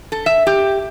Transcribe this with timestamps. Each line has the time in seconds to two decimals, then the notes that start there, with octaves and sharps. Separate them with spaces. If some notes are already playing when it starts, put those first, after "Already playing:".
0.12 A4
0.26 E5
0.47 G4